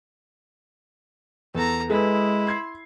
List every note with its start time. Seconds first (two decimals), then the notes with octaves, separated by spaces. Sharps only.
1.55 E2 A4 A#5
1.90 G#3 E4 G#4 A4 B4
2.47 C6 G#6 C7